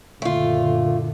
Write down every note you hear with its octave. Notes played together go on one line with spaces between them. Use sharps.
F#1 A#2 D3 A3 F4